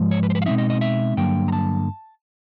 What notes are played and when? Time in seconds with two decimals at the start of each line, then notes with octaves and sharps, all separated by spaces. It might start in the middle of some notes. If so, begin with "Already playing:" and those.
Already playing: G#2 F3 G#3
0.11 C#5
0.23 B4
0.30 C5
0.35 B4
0.42 F5
0.46 B2 G#3 C4 D#4 E5
0.58 D#5
0.70 D#5
0.81 E5
1.17 G2 D3 F#3 A#3 G5
1.48 A#5
1.52 A5